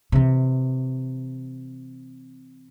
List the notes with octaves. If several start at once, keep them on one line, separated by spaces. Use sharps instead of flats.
C3 E3